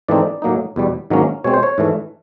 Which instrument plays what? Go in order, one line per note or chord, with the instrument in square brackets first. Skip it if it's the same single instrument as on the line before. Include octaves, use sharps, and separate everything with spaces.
[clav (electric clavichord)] G#2 E3 A3 C4 D#4 D5
A2 F#3 A#3 D#4
E2 B2 G3
G#2 D#3 F#3 A#3 C#4
B2 G#3 C4 C#5
C5
C#5
G#2 E3 A3